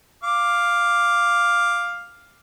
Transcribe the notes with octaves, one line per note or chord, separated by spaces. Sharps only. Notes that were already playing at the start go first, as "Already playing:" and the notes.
F5 D6